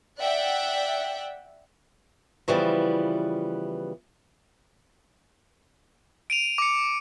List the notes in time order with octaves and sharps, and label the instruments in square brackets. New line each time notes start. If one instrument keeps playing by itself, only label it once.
[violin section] D5 E5 F#5 G5
[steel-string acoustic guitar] C#3 E3 F3 G3 B3
[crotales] D7 D#7 F7
D6 C#7